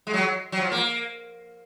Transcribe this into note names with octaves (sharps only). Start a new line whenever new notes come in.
G#3
F#3
F#3
F3
A#3